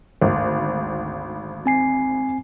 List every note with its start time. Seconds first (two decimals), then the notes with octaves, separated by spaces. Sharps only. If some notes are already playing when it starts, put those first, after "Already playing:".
0.22 G#1 D2
1.66 C4 G#5 C7